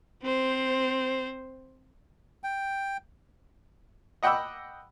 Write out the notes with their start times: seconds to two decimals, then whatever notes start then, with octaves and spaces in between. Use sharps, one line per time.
0.23 C4 C5
2.44 G5
4.23 D#5 F#5 G5 B5 D6 E6